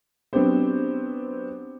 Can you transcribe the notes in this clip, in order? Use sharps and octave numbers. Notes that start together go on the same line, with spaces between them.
F#3 B3 C4 D4 G4 C5